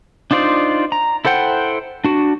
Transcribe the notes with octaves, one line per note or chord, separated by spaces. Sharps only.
D4 D#4 F4 C5 D5
A#5
E4 A4 C5 F#5 G5
D4 F#4